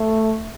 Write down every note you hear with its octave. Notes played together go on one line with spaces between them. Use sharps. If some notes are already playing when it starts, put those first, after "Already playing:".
Already playing: A3